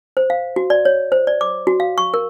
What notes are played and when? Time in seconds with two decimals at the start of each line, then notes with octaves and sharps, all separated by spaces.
0.17 C5
0.30 F5
0.56 F#4
0.70 D5
0.85 C#5
1.12 C5
1.27 D5
1.41 D6
1.67 F#4
1.80 F5
1.98 C#6
2.14 A#4